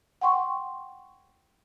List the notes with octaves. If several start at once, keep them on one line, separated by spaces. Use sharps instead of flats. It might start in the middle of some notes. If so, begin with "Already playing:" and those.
F#5 G5 C6 C#6